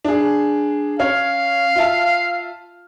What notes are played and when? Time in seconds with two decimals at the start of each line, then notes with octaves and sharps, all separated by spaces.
0.05 D4 G#4
0.99 C#4 C#5 F5 F6
1.76 F4 E5 A5